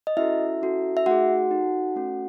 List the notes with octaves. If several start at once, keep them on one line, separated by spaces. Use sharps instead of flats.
D#5
C#4 E4 F#4 A4 E5
C#4 F#4 A4
E5
A3 D#4 F#4 G#4 F#5
D#4 A4
A3 C#4 F#4 A4